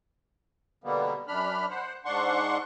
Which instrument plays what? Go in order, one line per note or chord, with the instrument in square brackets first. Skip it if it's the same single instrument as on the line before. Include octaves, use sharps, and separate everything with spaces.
[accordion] B2 D3 G3 A#3 B3
F#2 D4 B5 F6
C5 F#5
G#2 D4 F#5 C6 C#6